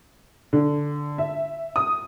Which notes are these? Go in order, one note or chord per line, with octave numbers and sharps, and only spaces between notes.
D3
E5
D#6